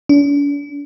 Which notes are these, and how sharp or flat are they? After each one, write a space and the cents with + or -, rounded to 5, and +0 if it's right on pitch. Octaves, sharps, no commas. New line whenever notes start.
D4 -45